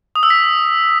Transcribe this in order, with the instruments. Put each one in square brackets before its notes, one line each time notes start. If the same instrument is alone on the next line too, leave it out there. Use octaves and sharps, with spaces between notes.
[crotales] D#6
E6
B6